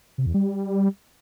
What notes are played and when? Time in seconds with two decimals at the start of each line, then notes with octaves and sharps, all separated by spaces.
0.18 C3
0.26 E2
0.34 G3